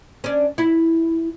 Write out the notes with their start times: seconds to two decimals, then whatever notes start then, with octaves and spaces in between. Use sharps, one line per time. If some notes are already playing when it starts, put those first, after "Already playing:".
0.24 C#4 D4
0.58 E4